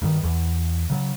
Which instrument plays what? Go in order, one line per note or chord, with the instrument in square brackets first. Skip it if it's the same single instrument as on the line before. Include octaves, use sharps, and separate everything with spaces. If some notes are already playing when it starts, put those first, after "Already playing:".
[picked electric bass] G2 D#3
E2
C#3 F#3